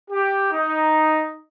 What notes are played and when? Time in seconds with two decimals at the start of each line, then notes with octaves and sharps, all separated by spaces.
0.11 G4
0.52 D#4